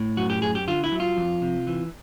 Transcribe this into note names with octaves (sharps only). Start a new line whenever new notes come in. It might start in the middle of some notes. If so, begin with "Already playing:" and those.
Already playing: A2
F#2 F#4
G4
F#2 G#4
G4
D3 F4
E4
F#3
F4
F2
C3
E3